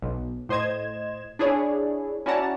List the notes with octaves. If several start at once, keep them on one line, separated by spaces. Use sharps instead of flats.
B1
A2 C5 D#5 G#6 E7
D4 E4 G#4 C#5 D5
C#4 E4 F#4 D5 A5 A#5